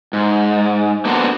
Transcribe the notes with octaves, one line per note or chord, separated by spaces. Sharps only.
G#2
A#3 B3 D4 F#4 A4 C5